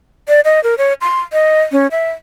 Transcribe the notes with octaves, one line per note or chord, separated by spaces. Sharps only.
D5
D#5
A#4
C#5
C6
D#5
C#4
E5